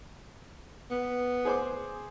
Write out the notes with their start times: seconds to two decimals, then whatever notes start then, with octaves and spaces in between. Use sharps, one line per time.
0.91 B3
1.45 G#4 C5 D6